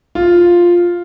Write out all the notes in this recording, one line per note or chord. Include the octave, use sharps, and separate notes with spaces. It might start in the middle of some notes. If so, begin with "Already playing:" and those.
F4